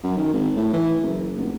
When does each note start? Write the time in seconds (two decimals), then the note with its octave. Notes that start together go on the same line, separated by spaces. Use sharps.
0.03 F#2
0.18 D#3
0.33 G#1
0.56 A2
0.73 E3
1.02 F#1
1.38 F1